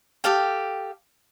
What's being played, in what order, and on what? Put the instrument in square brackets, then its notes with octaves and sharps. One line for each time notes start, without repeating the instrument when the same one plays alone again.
[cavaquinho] G4 A4 F5 G5